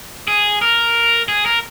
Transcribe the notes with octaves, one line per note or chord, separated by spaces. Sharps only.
G#4
A#4
G#4
A#4